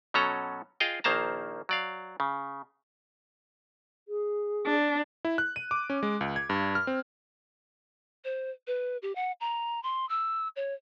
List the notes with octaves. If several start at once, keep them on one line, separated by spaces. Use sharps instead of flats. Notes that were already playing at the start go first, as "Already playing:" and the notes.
B2 F#3 C#4 A4 A#5
F4 G#4 D#5 F5 G5
A#1 D#3 A#3 C5 A5 A#5
F#3 D5 F5
C#3
G#4
D4
E4
F#6
D#7
D6
C#4
G#3
C#2
G#6
G2
F6
C4
C5
B4
G4
F#5
A#5
C6
E6
C#5